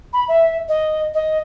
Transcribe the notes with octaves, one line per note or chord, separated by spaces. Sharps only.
B5
E5
D#5
D#5